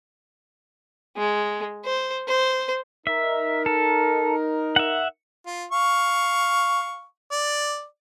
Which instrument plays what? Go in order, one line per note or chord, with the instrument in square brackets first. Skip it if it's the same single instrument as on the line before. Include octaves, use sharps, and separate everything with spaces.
[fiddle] G#3
C5
C5
[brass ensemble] D#4 A#4 [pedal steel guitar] E5
[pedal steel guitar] A4
E5 F#5
[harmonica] F4
F5 C#6
D5